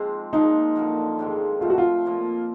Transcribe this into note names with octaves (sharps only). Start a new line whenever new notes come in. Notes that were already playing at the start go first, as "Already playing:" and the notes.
Already playing: G#2 F3 G#3 C4
A#2 F3 G#3 D#4
F#2 D3 F3 A#3
G#2 D#3 G#3 C4
A2 F3 A3 C4 F4
F#4
F4
A#2 F3 A#3